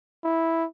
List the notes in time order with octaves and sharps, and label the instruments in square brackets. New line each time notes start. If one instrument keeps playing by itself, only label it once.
[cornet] E4